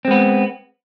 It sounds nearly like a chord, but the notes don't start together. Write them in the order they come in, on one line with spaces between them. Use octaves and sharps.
C4 G#3 B3